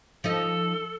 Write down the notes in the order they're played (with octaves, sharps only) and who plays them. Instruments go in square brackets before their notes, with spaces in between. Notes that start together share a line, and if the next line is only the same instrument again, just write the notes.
[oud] F3 D#4 D#5 [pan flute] A4